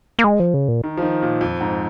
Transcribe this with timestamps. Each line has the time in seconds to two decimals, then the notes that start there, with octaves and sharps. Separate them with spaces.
0.19 A#3
0.24 G#3
0.40 F3
0.54 C#3
0.68 A#2
0.84 D#3
0.97 F3
1.02 D#3
1.22 A#2
1.41 F2
1.61 G#2